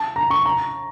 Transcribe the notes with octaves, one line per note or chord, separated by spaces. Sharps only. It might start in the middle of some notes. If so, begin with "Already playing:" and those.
Already playing: A5
A#5
C#6
A#5